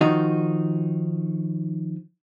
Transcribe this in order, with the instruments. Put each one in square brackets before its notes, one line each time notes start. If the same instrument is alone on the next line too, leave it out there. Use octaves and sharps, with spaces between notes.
[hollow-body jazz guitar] D#3 F3 D#4 F#4